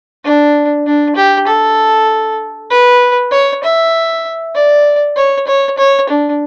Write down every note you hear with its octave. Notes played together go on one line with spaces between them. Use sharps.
D4
D4
G4
A4
B4
C#5
E5
D5
C#5
C#5
C#5
D4